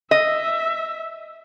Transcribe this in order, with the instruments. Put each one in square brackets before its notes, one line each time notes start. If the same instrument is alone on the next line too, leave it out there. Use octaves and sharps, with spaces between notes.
[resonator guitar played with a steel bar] D#5 [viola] E5